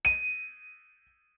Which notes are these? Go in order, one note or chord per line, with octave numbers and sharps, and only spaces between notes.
D#7